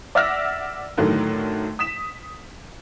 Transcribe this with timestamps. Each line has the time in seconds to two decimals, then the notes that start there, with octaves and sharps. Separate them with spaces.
0.15 D5 E5 F#5 E6 F6 A#6
0.97 A2 D3 D#3 F#3
1.79 D#6 B6 E7